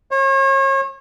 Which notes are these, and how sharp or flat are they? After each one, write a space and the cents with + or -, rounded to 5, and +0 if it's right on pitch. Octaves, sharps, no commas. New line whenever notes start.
C#5 -40